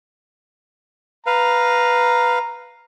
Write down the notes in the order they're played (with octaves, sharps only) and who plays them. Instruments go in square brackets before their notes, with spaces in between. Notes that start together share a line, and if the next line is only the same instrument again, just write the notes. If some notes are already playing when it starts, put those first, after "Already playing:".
[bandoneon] B4 F5 [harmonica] A#5